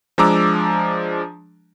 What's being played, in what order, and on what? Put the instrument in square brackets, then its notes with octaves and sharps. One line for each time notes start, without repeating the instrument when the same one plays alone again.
[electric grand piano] F3 G#3 D4 A#5 D6 E6